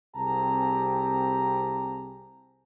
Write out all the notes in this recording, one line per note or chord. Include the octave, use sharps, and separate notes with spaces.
C2 C4 G4 G#4 A5 A#5